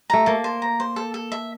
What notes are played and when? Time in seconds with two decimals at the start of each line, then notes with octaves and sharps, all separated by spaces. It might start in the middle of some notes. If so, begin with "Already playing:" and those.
0.10 A3 A#5
0.26 A#3 A4
0.44 C5
0.62 A#5
0.80 C5
0.96 A4
1.14 A4
1.32 E5